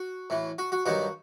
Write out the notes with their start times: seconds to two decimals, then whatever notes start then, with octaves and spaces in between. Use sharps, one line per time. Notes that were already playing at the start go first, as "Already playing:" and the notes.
Already playing: F#4
0.30 A2 E3
0.58 F#4
0.72 F#4
0.86 G2 D#3 F#3 F#4